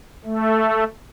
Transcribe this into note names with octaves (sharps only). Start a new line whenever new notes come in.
A3